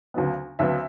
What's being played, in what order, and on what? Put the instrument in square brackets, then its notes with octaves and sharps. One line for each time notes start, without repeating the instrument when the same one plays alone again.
[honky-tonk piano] D2 C#3 F#3 B3
D2 C#3 F#3 B3 E5